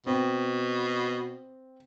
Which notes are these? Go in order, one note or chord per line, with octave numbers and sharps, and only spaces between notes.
B2 C4